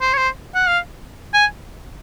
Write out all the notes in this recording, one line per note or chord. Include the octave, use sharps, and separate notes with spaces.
C5
C#5
C5
F#5
F5
G#5